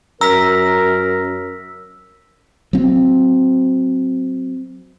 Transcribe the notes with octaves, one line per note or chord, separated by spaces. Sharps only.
F#2 A#4 A#5 E6 B6
F#3 C4